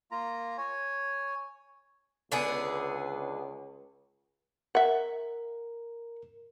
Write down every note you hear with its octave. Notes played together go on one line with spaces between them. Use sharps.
A#3 F4 A#5
C#5 G#5
C#2 D3 B3 G#4
A#4 E5 F#5